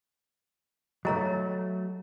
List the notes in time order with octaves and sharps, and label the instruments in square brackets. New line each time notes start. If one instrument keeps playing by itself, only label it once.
[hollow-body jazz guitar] F#3 A3 [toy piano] D#5 A#5